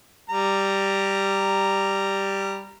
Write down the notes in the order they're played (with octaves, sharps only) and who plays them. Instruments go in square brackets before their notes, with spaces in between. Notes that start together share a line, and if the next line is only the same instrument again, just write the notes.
[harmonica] G3 A#5